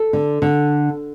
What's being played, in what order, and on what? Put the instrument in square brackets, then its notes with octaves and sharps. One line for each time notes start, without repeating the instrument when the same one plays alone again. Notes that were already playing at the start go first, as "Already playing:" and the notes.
Already playing: [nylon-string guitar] A4
D3
D3